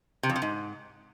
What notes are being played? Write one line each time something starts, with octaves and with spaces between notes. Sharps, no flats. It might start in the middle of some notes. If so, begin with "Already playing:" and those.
C3
F2
C3
G#2